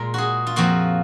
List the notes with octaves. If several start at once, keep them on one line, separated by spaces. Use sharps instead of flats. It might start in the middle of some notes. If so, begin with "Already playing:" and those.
Already playing: A#2 G#3 A#4
F#4 G#4
F4
F2 F3 A#3 F#4